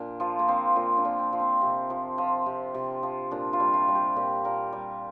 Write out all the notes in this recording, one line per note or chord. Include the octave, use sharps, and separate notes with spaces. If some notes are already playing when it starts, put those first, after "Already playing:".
Already playing: A#2 D4
F3 F4
A#3
F3 C4
A#2 F4
D4
A#2
C4
F3
C4
C3
F3
F3
C3
C3
F3
A#2 D4
F4
G3
F4
G3
G4
A#2 G4
A#2 A#4
G3